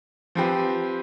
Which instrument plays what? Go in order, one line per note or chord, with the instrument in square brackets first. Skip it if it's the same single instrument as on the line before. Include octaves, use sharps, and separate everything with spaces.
[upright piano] F3 C4 G4 B4